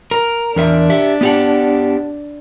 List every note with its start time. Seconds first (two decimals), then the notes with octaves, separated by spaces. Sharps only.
0.11 A#4
0.56 E2 D4 A#4 E5
0.90 G4 E5
1.21 B3 G4 F#5